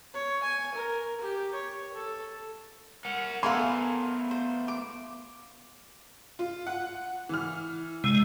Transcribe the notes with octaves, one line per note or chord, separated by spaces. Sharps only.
C#5
G#5
A#4
G4
C#5
A4
A#4 F#5
A3 B3 A4 A#4 F5 G#5 C6
C5
D6
F4
F#5
E3 F6
C3 G#3 E6 D#7